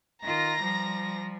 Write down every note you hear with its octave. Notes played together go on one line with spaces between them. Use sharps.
D#3 F4 A#5 A#6
F3 G3